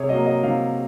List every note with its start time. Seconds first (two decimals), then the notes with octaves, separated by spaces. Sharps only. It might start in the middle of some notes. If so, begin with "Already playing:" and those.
Already playing: C3 G#4 C#5
0.09 F#3 A#3 D#5
0.26 D#5
0.43 C3 F5